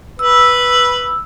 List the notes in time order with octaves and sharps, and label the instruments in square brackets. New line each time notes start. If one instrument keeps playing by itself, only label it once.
[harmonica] B4 [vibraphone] E6